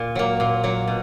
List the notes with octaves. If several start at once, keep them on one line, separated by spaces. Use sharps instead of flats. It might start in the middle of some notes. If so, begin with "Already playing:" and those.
Already playing: A#2
F#3 A#3
A#2
F#3 A#3
B2